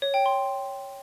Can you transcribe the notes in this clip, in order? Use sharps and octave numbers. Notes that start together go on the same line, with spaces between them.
C#5
G5
C6